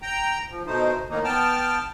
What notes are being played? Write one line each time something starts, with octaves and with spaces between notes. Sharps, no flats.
G5 A#5
F3
B2 A3 D#4 C5
A2 D#3 A#3 D#4
B3 G5 A5 F6